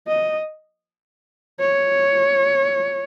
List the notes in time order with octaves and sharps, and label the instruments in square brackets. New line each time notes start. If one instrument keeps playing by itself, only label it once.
[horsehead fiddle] D#5
C#5